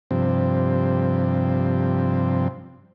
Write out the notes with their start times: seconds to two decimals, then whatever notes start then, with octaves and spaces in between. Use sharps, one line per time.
0.11 G2 C3 F3 C4